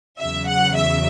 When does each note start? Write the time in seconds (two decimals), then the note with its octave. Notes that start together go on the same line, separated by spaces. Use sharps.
0.18 E2 C#3 F#3 E5
0.47 F#5
0.75 E5